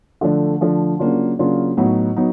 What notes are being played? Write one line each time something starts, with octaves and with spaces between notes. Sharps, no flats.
D3 F3 A3 D4
D3 F3 A3 D4
C#3 F#3 A#3 D4 F4
C#3 F#3 A#3 D4 F4
A2 F#3 B3 D#4
F#3 B3 D#4